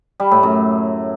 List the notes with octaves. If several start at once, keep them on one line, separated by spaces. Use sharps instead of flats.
G3
A2
F#2